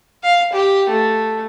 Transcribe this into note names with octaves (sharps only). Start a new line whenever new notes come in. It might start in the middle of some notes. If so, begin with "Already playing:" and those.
F5
G4
A3